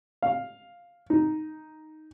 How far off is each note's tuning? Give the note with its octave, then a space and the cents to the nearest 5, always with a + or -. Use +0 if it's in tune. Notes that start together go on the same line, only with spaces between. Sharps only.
F5 +5
D#4 +0